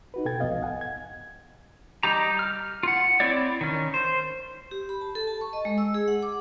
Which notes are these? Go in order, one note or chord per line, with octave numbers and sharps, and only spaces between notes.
D#4 F#4 B4
B2 A4 G5 G#6 A6
C2 G#2 F3 B3 D#5 F5
F#5 G#5
G#6
G3 D#4 G4 A#5
F6
F4 F#5
C4 E4 C#5 D5
D#3 C#4
C5
G4
B5
A5
A4
A5
C#6
D#5
G#3
E6
G#4
F#5
D6